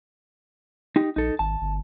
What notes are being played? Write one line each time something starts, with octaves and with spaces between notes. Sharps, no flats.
D#4 G4
A#1 D#4 A4
G#1 A5
G1